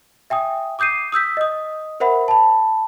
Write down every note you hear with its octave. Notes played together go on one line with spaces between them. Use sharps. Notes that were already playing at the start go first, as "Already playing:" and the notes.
E5 G5 G#5 D#6
D6 D#6 G6 C7 D#7
D#6 E6 G6 B6
D#5 D#6
A#4 C5 E5 F#5 B5
A5 B5